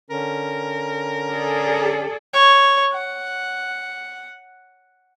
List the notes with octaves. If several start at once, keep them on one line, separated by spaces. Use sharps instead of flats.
D3 C#4 A#4
G#4 A4 D5
C#5
F#5